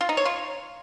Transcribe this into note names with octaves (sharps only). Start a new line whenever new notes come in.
F4
D#4
C#5
F4